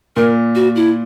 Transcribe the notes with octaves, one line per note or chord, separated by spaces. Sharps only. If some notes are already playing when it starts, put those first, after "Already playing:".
A#2 A#4
F#4
E4